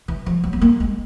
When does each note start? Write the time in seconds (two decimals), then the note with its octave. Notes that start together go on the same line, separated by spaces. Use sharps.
0.08 E3
0.26 F3
0.44 F#3
0.53 B3
0.61 A#3
0.80 G#3